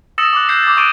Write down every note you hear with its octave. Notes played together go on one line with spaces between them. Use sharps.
D#6 E6 A6 A#6 C#7 E7
D6 F#6
F#6 G6 C7
D6 A6
C#6 F#6 A6 D7 D#7 G7